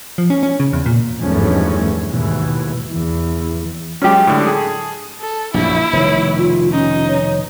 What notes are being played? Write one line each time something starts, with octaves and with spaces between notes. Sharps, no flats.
F3
C#4
C#4
C#3
E2
A#2
G#1 E2 G2 F3 A3 C#4
D#2 G#2 B2 E3
E2 E3
F#3 G#3 C#4 G4
A2 D3
G#4 A4
A4
A#1 F#2 B2 E4
F1 B2 D#3 C#5
F4
C#4 D#4
C#5